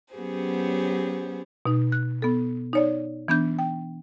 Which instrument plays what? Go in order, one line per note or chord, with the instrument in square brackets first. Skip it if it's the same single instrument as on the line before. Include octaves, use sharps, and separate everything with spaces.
[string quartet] F#3 B3 C#4 G4 G#4 C5
[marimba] B2 D#4
F#6
B3 A4
D#4 C#5 D5
E3 B3 D4 G6
G5